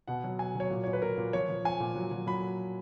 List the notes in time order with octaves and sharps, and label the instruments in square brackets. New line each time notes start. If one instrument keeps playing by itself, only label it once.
[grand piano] B2 F#5
F#3
B2 G#5
F#3 C#5
A#2
A#2 C#5
B4
A#2 A#4
A#2
F3 C#5
F3
F3 G#5
A#2
F#3
F#3
F#3 B5